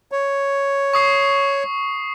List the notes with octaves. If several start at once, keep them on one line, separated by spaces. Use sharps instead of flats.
C#5
C#6 D#6 C7